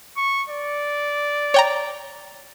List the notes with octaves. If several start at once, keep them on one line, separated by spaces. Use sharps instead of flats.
C#6
D5
C#5 G5 A#5